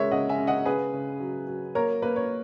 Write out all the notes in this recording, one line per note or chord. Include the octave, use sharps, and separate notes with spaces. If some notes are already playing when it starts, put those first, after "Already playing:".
Already playing: C#3 G#3 A#4 C#5 E5
C#3 D#5 F#5
E5 G#5
C#4
D#5 F#5
C#3 G#4 B4
C#3
F#3
F#3
A#3 A#4 C#5
A#3 B4
C#5